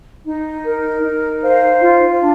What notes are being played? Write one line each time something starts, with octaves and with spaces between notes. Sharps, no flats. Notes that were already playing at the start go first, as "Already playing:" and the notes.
D#4
A#4
D#4
C5 F5
F4
D4